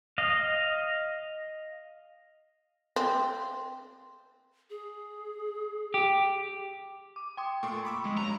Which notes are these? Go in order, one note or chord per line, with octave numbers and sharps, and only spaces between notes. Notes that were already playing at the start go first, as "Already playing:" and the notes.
D#5 F5
C4
G#4
G4
D6
G5 C6 D#6
A#2 A3 C6 C#6
B5 D6 E6
G#3
G2 F#3 A#5